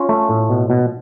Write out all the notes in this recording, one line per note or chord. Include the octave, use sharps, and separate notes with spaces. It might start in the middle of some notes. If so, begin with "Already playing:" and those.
Already playing: C#4 F4
A3
A2
B2
B2